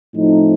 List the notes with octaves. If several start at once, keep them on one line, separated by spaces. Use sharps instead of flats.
A2 F3 A3 C4 D#4